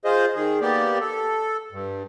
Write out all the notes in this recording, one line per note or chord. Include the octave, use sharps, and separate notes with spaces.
F4 G#4 C5 D#5
D#3 G#4
A#3 B3 G4 D5
A4
G2